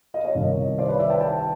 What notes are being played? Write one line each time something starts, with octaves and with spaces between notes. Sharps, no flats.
D#5 F5
C#5 D#5
C2 C3 D#3
C5 D5
B4 C#5
D5 E5
G5 A5
G5 A5